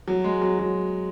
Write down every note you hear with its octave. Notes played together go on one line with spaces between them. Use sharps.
F#3
G#3
F#3
F#3